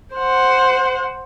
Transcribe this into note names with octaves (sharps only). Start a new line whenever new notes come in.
C5 F#5